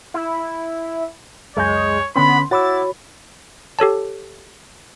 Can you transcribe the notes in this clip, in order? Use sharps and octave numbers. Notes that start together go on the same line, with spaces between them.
E4
C#2 F#2 G#3 C#5 G6
D3 B3 C#4 B5 C6
E4 F#4 C#5 F#5 B5 D6 E6 A6
G4 A4 C#5 A5